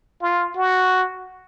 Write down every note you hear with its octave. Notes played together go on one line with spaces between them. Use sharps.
F4
F#4